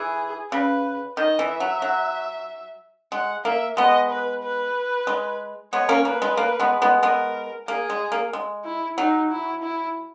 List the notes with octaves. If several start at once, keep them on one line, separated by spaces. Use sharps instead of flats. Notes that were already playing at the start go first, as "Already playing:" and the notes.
Already playing: E3 G#4
C#3 B4
D#3 D#5
E3
E5
F#3
F#3
G#3 F#5
A#3 E5
G#3 B3 D#5
B4
B4
G#3
G#3 B3 C#5
A#3 C#4
A#3 B4
G#3
A#3
G#3 B3
G#3 B3
G#3 B3 A#4
A#3 G#4
G#3
A#3
G#3
E4
F#3 D#4
E4
E4